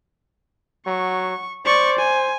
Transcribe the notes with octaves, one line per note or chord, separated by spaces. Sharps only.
F#3 C#6
C5 D5 C#6
G#5